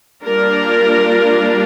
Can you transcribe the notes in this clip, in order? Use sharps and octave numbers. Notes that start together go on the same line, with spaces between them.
G3 A#3 D4 F4 A#4